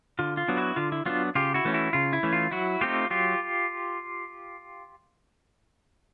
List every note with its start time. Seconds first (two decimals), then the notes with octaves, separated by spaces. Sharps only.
0.19 D3 F4
0.37 F4
0.48 F#3 B3 D4
0.57 E4 F#4
0.76 D3 F4
0.92 E4
1.06 F#3 B3 D4 F4
1.35 C#3 F4 G4
1.54 E4 F#4
1.65 E3 A3 C#4
1.74 E4 F#4
1.93 C#3 F4
2.13 E4
2.23 E3 A3 C#4
2.33 F4
2.51 F#3 E4 F#4
2.81 A3 C4 D#4 F4 G4
3.10 F#3 F4 G4